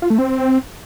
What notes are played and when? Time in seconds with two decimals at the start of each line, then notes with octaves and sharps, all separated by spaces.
0.02 F4
0.10 A3
0.18 C4